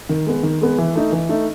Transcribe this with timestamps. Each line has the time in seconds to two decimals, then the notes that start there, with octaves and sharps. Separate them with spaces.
0.09 D#3
0.26 G#3 B3
0.43 D#3
0.61 G#3 B3
0.78 E3
0.95 A3 D#4
1.12 E3
1.29 A3 D#4